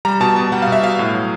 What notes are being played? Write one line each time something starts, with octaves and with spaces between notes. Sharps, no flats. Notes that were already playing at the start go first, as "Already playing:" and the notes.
G3 A#5
B2 A5
B2 A5
G3 F#5
F5
B2 E5
B2 F5
A2
F#3